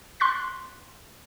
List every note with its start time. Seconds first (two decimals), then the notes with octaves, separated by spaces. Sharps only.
0.20 C6 C#6 F#6 A6 B6